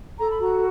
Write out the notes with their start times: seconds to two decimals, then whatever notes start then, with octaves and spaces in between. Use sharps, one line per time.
0.19 A4 A#5
0.30 B5
0.39 F#4 A#5